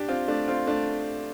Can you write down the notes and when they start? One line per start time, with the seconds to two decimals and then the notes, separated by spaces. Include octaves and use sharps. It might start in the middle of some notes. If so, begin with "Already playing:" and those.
Already playing: D4 G4
0.08 C4 F4
0.28 A3 D4
0.48 C4 F4
0.67 A3 D4